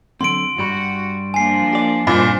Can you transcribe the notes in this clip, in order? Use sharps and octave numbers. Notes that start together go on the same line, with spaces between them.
D3 F#3 C4 C6 D7
G2 G3 F#4 B5
F3 A#3 D4 G#5 C7
G4 D5
G2 A#2 C4 D#4 C5